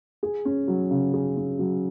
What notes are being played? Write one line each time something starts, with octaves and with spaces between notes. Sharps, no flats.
G#4
C#4
F#3
C#3
G#4
C#4
F#3